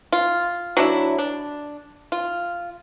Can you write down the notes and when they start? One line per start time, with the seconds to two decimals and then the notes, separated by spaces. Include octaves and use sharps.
0.12 F4
0.77 F#3 D4 E4
1.18 D4
2.12 F4